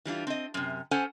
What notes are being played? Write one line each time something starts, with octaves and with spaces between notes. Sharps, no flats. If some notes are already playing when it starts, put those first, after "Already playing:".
E3 G3 D4 F4
C4 D#5
F#2 C3
C#4 A4 C5 F#5 G#5 A5